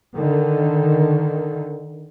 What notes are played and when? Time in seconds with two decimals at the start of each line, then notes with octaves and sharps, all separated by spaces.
0.15 D3 D#3